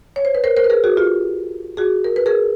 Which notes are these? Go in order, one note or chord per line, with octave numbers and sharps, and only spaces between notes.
C#5
C5
B4
A#4 C5
A#4 C5
B4
G#4 A#4
F#4 G#4
F4 G4
F#4 G#4
A#4
B4
G#4 A#4